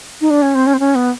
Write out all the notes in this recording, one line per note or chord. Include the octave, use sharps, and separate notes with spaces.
D#4
D4
C#4
C4
C#4
C4
C#4
B3